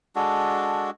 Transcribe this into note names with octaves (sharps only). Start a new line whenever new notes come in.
G#3 D4 F#4 A4